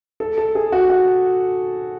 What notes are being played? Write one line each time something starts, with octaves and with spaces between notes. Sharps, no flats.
A4
A4
G#4
F#4
F#4